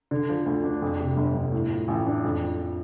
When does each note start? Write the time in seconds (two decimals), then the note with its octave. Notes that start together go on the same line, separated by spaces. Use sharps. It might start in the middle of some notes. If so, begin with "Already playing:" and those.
0.11 D3
0.29 F3
0.46 D2
0.64 D4
0.82 F2
1.00 C3
1.17 G1
1.35 G1
1.52 A2
1.70 F3
1.88 A1
2.06 D4
2.24 F2
2.41 F3